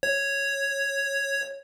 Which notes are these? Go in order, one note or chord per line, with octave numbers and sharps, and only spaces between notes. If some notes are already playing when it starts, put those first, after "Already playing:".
C#5